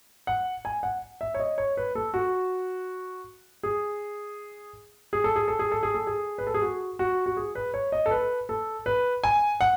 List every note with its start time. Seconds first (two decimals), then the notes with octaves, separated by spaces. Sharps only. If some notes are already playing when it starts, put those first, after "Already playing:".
0.27 F#5
0.65 G#5
0.83 F#5
1.21 E5
1.34 C#5
1.40 D#5
1.58 C#5
1.77 B4
1.95 A4
2.14 F#4
3.63 G#4
5.13 G#4
5.24 A4
5.36 G#4
5.48 A4
5.59 G#4
5.72 A4
5.83 G#4
5.95 A4
6.07 G#4
6.38 B4
6.47 A4
6.54 G#4
6.62 F#4
6.99 F#4
7.26 F#4
7.37 G#4
7.55 B4
7.74 C#5
7.92 D#5
8.06 A4
8.11 B4
8.49 A4
8.86 B4
9.24 G#5
9.61 F#5